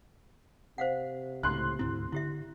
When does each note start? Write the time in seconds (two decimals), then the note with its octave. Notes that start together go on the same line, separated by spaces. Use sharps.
0.78 C3 C5 F5 F#5
1.43 C#2 A2 C6 F#6
1.79 D2 G#2 C4 E4
2.13 D3 E4 G4 E5